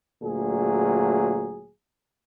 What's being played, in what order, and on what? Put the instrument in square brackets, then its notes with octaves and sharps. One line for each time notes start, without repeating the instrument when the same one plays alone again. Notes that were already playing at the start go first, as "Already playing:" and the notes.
[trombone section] D2 A#2 F#3 G#4